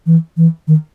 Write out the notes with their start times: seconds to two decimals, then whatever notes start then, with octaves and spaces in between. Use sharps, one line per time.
0.07 E3
0.37 E3
0.68 D#3